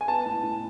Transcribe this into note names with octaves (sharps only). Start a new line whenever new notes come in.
G#5
B3 A5
A2
A2